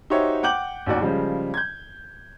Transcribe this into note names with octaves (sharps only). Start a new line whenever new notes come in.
D#4 F#4 G4 C5 C#5 E5
F#5 G5 D6 G6 F#7
A1 D#2 F#4 D5
C#3 F3 G3 G#3
G6 G#6